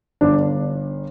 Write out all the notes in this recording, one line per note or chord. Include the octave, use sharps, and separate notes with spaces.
G1 D4